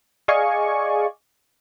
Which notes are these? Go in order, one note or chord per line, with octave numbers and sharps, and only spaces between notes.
G#4 D5 D#5 F5 G#5 C#6